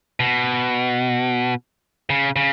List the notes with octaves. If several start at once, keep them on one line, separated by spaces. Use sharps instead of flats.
B2
C#3
C#3